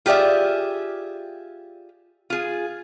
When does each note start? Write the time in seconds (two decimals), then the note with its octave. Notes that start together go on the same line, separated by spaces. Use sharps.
0.06 F4 G4 G#4 D5 E5
2.30 F4 G#4